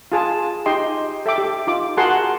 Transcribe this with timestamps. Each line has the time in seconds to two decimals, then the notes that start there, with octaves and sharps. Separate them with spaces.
0.12 F4 G#4 A5
0.66 D#4 G4 D#5 G5 C6
1.26 A4 E5 G5 D6
1.38 G4
1.67 D#4 F4 D6
1.97 F#4 G#4 A#4 F#5 A5 C6